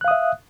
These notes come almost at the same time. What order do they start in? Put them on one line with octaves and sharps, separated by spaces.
F#6 F5 D#6 E5